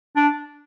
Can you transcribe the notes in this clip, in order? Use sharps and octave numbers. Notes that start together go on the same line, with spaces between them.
D4